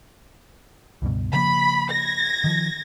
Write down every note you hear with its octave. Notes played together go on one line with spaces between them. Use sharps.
C#2 G2 B2
C#3 F3 A#3 B5
G#6 A#6
D#3 F3